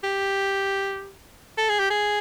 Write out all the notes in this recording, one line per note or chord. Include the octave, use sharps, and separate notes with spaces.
G4
A4
G#4
G4
G#4